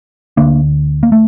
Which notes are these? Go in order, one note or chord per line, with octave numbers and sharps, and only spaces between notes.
D2 D3 A#3 D4
A#3
A3